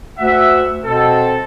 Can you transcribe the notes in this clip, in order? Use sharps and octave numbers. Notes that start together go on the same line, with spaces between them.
D2 E5 F#5
B2 C4 A4